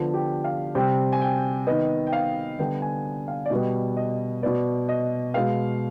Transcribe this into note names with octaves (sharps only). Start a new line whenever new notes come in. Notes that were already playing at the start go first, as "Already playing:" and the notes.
Already playing: D3 F3 B3
G4
F5
C3 G3 C4 G5
G#5
G5
D#3 B3 D#5
G5
F5
D3 G3 B3 G5
G#5
F5
D5
B2 G3 B3 D#5
D#5
B2 B3 D5
D#5
B2 G#3 B3 F5